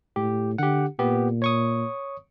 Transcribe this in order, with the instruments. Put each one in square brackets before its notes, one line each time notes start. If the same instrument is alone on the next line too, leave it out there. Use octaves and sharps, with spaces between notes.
[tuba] A2 [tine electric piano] G4
[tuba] D3 [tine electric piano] G4 F#5
[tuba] A#2 [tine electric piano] B3 G4
[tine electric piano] C#5 C#6 D#6